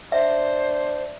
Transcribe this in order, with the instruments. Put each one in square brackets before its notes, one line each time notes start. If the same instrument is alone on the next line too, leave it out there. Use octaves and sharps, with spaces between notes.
[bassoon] D4 [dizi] C5 [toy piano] E5